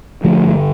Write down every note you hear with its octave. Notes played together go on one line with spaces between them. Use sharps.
D3 F3 A3
G1